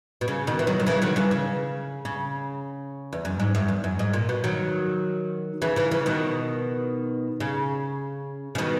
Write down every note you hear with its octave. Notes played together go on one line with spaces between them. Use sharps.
B2
C#3
B2 D#3
E3
D#3 F#3
D#3
C#3 E3
D#3 F#3
C#3 E3
C#3
C#3
E2
F#2
G#2
F#2
E2
F#2
G#2
A#2
B2
D#3 F#3
C#3 E3
C#3 E3
C#3 E3
B2 D#3
C#3
C#3
B2 D#3